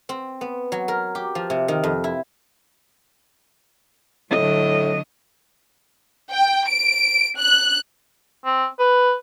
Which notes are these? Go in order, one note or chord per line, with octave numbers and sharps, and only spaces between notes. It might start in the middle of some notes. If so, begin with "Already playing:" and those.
C4
B3
F#3
A#4
G4
F3
C3
D#3
F2
E4
A2 D3 F#3 D#5
G5
D7
F#6
C4
B4